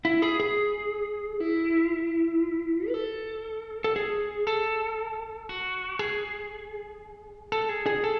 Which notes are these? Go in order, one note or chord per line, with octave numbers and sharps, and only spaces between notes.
E4
G#4
G#4
E4
B4
A4
A4
G#4
A4
F#4
G#4
A4
G#4
G#4
A4